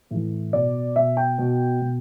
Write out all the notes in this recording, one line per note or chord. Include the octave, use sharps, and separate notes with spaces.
A2 E3
B2 D5
B2 E5
G5
B2
B2